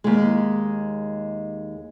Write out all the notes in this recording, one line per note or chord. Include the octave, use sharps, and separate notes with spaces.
D#2 G#3